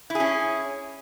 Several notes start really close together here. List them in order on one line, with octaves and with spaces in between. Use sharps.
E4 G#4 C#4